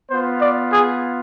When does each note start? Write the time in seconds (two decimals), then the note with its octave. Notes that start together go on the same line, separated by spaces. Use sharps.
0.10 B3 F4 C5
0.41 D5
0.72 G#4